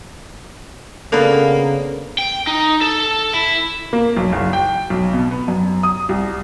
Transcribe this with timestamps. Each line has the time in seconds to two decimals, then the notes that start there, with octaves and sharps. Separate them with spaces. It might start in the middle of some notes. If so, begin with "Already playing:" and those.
1.12 C#3 A#3 B3 D4 A4
2.18 G5
2.47 D#4
2.81 A4
3.34 E4
3.93 A#3
4.17 B1
4.32 F#1
4.53 G5
4.90 B1
5.13 B2
5.31 B3
5.48 F#2
5.83 D#6
6.09 C2